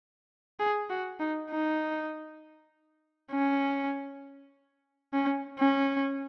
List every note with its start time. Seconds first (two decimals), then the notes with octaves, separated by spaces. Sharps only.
0.60 G#4
0.90 F#4
1.20 D#4
1.51 D#4
3.32 C#4
5.13 C#4
5.59 C#4